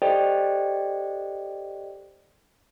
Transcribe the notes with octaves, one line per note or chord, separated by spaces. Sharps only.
G4 A4 C5 D5 D#5 G5